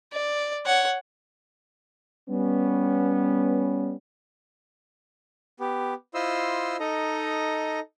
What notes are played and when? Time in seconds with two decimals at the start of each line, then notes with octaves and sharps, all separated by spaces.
0.13 D5
0.66 C#5 F#5
2.30 G3 B3 C#4
5.60 B3 G4
6.14 E4 F4 C5 D#5 C6 E6
6.80 D#4 A4 D#5 A#5